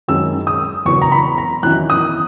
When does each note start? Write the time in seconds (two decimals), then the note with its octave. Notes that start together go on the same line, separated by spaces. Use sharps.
0.08 F#2 D#3 G#3 C#4 E6
0.47 D#6
0.85 E2 C#3 F#3 B3 C#6
1.02 A#5
1.12 B5
1.38 A#5
1.63 E2 D#3 F#3 C#4 E4 F#6
1.90 D#6